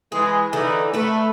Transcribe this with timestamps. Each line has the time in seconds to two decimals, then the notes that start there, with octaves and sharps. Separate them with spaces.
0.12 E3 G#3 G#4
0.53 D3 E3 D#4
0.94 A3 A4 B4